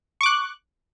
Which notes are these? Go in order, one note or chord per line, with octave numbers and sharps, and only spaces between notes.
C#6 D6 F#6